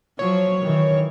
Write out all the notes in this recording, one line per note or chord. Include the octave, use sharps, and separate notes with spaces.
F3 F#3 C#5
D#3 E3